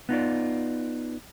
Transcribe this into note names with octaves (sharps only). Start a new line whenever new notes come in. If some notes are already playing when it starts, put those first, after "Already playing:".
B3 D#4 F4 D5